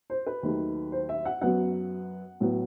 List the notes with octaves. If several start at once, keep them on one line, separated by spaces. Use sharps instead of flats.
C5
B4
D#2 D#3 F#3 A3
C5
E5
F#5
F#2 F#3 B3 F#5
A2 F#3 B3